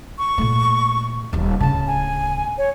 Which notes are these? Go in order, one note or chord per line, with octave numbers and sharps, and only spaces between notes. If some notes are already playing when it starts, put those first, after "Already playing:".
C#6
A#2 A3
D#1 D#2
D1 C#3 A5
G#5
C#5